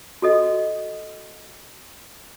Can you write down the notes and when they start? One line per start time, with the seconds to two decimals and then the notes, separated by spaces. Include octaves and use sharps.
0.22 F#4 A4 D#5